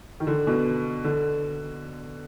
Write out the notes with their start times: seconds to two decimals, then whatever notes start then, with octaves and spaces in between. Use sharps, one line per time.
0.20 D#3
0.27 D3
0.47 B2
1.04 D3